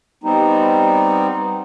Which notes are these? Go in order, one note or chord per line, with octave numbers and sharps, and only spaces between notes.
G3 B3 C4 D#4